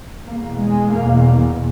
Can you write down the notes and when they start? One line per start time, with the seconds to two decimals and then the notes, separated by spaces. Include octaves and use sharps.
0.25 E2 B2 A#3
0.59 G#3
0.93 E2 B2 A#3